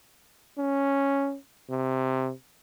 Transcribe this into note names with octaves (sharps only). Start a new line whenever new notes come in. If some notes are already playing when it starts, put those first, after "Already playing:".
C#4
C3